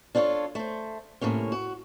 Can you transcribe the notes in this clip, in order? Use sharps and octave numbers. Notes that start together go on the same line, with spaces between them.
D4 F4 A4 C5 C#5
A3 C5
A2 C3 A#3 C#4
F#4